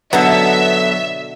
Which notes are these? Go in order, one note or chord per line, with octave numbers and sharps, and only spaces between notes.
B2 D3 F#3 B3 A4 E5